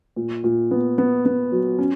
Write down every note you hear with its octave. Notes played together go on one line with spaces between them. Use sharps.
A#2
A#2
B3
B3
B3
F#3
C#4